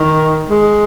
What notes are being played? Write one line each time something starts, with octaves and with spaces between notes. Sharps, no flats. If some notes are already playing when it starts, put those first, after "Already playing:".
Already playing: D#3
G#3